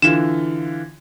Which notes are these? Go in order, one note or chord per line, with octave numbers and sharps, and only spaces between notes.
D3 E3 F4 E7